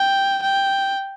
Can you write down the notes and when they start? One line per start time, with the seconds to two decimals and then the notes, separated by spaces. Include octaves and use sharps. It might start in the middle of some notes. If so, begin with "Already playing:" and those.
Already playing: G5
0.43 G5